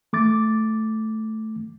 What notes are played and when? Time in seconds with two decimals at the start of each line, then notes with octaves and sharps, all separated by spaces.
0.13 A3 D6 A6